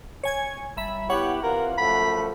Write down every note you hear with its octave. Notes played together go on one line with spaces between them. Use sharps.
C#5 G#5 G#6
G1 E5 B5
B3 E4 G4 C#5 F#5
C3 E3 F4 A#4
F#2 F3 A3 B5